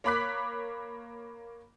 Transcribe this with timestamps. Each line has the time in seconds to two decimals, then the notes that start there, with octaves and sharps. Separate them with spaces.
0.04 A#3 C#5 B5 D6 F#6 B6